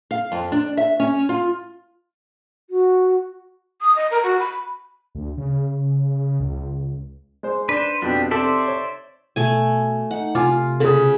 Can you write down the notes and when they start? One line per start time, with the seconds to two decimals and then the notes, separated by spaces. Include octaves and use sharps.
0.11 F5
0.32 F2
0.52 D4
0.77 E5
1.00 C#4
1.29 F4
2.70 F#4
3.81 D#6
3.96 D#5
4.11 A#4
4.23 F#4
4.39 B5
5.15 D2
5.37 C#3
6.40 C#2
7.43 G#3 C5
7.69 D4 B4 C5
8.02 F2 B2 D4 G4
8.31 C3 A4 C5 D5 E5
8.68 C#5
9.36 B2 A3 G#5
10.11 D#4 F#5
10.35 C3 F4 G#5 D6
10.80 C#3 G#4 B5 D#6